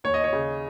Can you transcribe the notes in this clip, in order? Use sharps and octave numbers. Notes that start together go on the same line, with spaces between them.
D#2 C#5
D#5
C#5
C#3